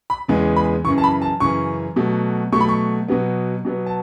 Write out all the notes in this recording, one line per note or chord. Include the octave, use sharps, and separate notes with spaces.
B5
E2 C#3 E3 G#3 B3
B5
F#2 C#3 E3 C#6
A5
B5
A5
F#2 C#3 E3 C#6
B2 F#3 A3
B2 F#3 A3 C#6
B5
C#6
B2 F#3 B3
B2 F#3 B3
A5